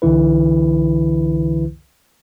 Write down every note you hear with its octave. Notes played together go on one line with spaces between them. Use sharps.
C2 D3 E3 E4 B4